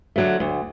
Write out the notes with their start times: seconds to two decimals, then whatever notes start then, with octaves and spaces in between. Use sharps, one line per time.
0.16 D3 F#3 A3
0.40 D2